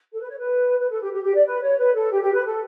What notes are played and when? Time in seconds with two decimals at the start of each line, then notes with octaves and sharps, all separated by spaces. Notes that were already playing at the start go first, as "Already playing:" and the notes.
0.13 A4
0.21 B4
0.29 C#5
0.38 B4
0.79 B4
0.90 A4
1.01 G4
1.12 G4
1.23 G4
1.35 D5
1.46 B4
1.62 C#5
1.78 B4
1.94 A4
2.11 G4
2.22 G4
2.33 B4
2.45 A4